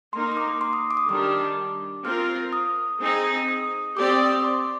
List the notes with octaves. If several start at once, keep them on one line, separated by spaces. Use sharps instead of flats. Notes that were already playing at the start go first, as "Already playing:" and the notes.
A#3 D#4 A#4 C6
C6
D6
C6
D#6
D6
D#6
D#3 G3 D4 G4 D6
C4 F4 A#4 F6
D#6
C4 D#4 G#4
D#6
C4 G4 D5 D6
D#6
D#6
D6
C6